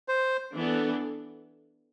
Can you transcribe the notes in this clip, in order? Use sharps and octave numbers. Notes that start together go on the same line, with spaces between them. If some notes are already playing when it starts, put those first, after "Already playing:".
C5
E3 B3 D4 A4